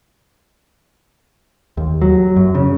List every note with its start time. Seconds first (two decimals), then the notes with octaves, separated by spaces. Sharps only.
1.77 D#2
2.02 F#3
2.36 F#2
2.55 C#3